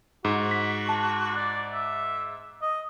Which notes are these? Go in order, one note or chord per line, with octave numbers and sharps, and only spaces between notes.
G#2 F#4
B6
A5
D5 F#6
E5
D#5